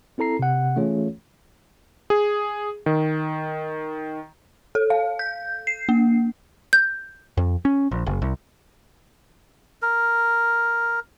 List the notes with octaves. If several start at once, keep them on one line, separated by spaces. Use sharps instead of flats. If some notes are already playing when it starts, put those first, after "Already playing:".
C4 E4 A4 A#5 C7
C3 F#5
E3 A3 C#4 F4 G#4 C#5
G#4
D#3
A4
F5
G6
C7
A#3
G6
F2
C#4
A#1
F#1
C2
A#4